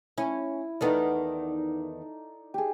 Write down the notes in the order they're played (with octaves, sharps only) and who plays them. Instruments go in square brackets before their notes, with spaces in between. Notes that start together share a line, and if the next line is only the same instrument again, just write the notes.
[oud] C#4 [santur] E4
[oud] E2 D#3 B3 [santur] D#4 A4 D5
[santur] G4 G#4